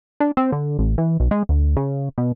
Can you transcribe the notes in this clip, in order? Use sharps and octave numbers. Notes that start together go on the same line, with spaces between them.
D4
C4
D3
A1
E3
B1
G#3
D2
C#3
B2